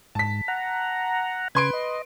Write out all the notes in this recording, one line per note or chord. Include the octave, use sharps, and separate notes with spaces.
G#2 A5 B6
F#5 A#5
C#3 B4 C6 G#6 D7
D#5